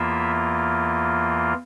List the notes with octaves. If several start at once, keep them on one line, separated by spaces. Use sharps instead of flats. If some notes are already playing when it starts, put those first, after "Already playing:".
Already playing: E2 E3 A#3 F4 E5